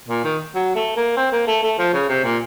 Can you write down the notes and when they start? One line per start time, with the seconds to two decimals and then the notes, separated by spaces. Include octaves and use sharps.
0.08 A#2
0.24 D#3
0.55 F#3
0.75 A3
0.96 A#3
1.17 C4
1.32 A#3
1.47 A3
1.63 A3
1.78 F3
1.93 C#3
2.09 C3
2.24 A#2